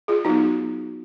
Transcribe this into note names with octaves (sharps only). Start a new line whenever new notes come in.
F4 G#4
F#3 B3 D#4 F#4